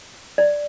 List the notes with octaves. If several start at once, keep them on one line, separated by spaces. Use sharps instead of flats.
D5